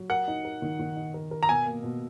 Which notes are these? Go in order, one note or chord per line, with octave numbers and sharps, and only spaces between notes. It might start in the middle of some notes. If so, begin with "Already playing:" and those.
Already playing: F#3
A#4 F#5
D#4
A#4
D#3
D#3
D#4
A#4
A#4
A#5
B2 G#5
A#3
B2